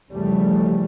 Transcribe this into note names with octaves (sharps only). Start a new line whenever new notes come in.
F2 C#3 E3 G3 A3